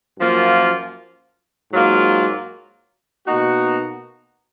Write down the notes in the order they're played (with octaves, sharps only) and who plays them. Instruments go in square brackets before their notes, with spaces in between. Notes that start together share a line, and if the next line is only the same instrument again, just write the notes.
[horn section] F#2 F3 A#3 F4
G#2 F#3 A#3 F4
B2 A#3 D#4 F#4